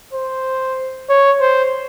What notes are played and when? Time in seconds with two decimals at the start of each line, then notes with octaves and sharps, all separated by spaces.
0.14 C5
1.09 C#5
1.41 C5